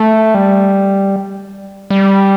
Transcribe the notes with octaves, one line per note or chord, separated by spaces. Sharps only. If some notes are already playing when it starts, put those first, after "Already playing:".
Already playing: A3
G3
G3